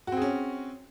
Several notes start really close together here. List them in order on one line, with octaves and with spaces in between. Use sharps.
F#4 C4 G#4 C#4